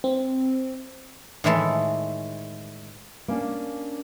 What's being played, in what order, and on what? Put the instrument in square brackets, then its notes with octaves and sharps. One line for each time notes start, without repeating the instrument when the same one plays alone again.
[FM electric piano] C4
[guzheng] A2 D#3 E3 G#3 A3 A4
[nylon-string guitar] A#3 C#4 D4